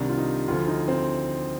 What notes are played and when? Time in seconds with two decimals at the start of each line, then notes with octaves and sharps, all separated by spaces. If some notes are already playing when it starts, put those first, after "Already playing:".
Already playing: C2 C3 D#3 G3 D4
0.09 F4
0.18 D#4
0.48 D2 D3 F3 F4
0.68 D#4
0.88 C4